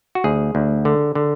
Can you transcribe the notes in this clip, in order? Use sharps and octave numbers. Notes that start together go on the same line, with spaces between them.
F#4
D2 G#4
D2
D3
D3